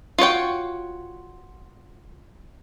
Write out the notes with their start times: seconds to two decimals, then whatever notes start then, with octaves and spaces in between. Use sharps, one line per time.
0.18 F4 F#4 C#5 G5